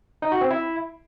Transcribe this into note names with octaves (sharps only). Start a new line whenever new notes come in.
D#4
F#4
C4
E4